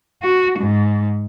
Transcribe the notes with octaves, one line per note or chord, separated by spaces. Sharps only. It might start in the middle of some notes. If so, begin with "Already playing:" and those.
F#4
G#2